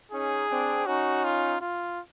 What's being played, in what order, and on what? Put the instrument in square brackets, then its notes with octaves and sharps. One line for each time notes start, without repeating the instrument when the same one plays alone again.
[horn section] C#4 D#4 [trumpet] G#4
[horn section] C4 D4
[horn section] C#4 D#4 [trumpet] F#4
[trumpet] F4
F4